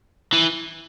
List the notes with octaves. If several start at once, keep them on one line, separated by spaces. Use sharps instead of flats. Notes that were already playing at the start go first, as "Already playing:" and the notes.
E3